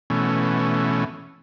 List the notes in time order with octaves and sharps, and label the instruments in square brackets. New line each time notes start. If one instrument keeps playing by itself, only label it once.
[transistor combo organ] B2 E3 A3 C#4